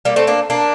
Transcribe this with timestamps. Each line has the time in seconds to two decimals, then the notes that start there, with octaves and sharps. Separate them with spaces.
0.05 G3 A#3
0.16 A3 C4
0.27 A#3 D4
0.50 A#3 D4